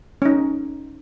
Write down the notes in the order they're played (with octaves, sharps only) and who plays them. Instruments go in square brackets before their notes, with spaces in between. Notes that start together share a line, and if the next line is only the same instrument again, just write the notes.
[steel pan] C#4 D#4